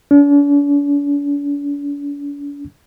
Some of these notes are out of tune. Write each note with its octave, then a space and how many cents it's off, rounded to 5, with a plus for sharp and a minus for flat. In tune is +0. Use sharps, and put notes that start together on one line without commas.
D4 -45